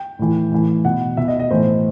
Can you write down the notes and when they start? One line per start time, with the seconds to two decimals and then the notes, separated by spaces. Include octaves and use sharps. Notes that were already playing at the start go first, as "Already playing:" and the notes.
Already playing: G5
0.19 A2 E3
0.51 A2 E3
0.85 B2 F#5
1.17 B2 E5
1.28 D#5
1.39 D#5
1.51 A2 E3 C5